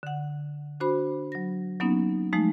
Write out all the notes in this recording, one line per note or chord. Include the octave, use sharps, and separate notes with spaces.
D3 F#5
D4 F#4 C5 B5
F#3 A#6
F#3 A#3 B3 C#4 D#4
F3 G#3 A3 D#4